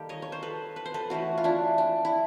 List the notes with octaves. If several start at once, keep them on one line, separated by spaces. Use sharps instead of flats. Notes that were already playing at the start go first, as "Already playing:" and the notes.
Already playing: D#3 G3 A#3 G4 A4
C#5 D#5
C#5
C5
A4 B4
B4
C5
A4 B4
E3 A3 C#4 E4 F#4
F4
D4 E4
D4
E4